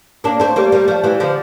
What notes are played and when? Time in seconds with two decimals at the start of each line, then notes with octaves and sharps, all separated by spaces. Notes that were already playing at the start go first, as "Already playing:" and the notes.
0.24 A#3 D4
0.40 A3 C4
0.56 G3 A#3
0.72 G3 A#3
0.88 F3 A3
1.03 E3 G3
1.20 D3 F3